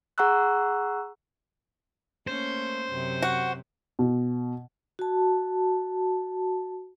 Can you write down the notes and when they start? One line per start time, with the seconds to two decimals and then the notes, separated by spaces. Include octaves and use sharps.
0.18 G#4 F#5 A#5 C#6 E6 F#6
2.27 A3 A#3 C#4 C5
2.91 F#2 C3
3.22 F#4 F#5
3.99 B2
4.99 F#4 A5